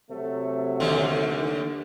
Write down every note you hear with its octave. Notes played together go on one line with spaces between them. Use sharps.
C3 F#3 A3
D#2 D3